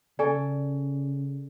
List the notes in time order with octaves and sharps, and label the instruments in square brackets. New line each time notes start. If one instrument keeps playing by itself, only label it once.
[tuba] C#3 [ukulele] A4 [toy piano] D5 G#5 C#6